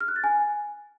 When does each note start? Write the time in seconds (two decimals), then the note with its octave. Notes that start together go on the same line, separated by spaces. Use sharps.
0.01 F6
0.08 F#6
0.16 A6
0.24 G#5